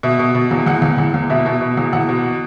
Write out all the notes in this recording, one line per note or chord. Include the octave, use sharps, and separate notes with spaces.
B2 E5
B2
B2
E2
E2 F#5
E2
E2
E2
B2 E5
B2
B2
E2
E2 F#5
B2